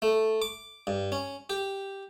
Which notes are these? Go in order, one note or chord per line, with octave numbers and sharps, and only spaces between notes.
A3
D6
G2
C#4
G4